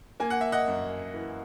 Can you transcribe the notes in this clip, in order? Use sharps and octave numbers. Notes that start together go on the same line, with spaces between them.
A#3 G#5
F#5
E5
D#5 F#5
F#2
E3